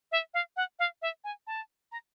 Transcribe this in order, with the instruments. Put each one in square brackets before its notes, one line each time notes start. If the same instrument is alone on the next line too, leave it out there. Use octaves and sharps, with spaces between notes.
[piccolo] E5
F5
F#5
F5
E5
G#5
A5
A#5